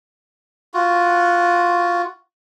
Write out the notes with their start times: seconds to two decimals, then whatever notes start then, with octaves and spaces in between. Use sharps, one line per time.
0.74 F4 F#4